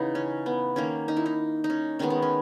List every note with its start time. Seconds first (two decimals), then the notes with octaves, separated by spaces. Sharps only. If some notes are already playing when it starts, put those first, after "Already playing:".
Already playing: C#3 E3 B3 D#4
0.15 C#4
0.46 B3
0.76 D#3 A#3 C#4
1.08 D#4
1.17 E4
1.26 D#4
1.64 D#4
1.70 C#4
1.99 D#3 G#3 B3 C#4
2.10 B3
2.22 C#4